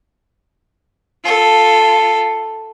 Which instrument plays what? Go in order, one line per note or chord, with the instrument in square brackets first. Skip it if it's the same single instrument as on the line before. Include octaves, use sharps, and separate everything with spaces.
[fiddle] F4 A4